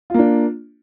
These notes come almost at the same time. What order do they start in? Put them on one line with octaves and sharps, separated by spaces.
F4 A#3 D4